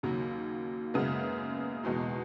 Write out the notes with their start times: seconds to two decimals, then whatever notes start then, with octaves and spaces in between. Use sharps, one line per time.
0.03 D#2 C#3 F#3 A#3
0.94 F#2 C#3 G#3 B3
1.83 E2 B2 G#3 D#4